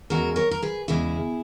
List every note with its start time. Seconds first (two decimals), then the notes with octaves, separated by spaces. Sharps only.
0.10 E2 C#3 G#3 F#4 A#4
0.36 A#4 C#5
0.51 A#4
0.62 G#4 B4
0.88 E2 C#3 G#3 E4 G#4